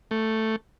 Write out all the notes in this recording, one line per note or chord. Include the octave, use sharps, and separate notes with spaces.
A3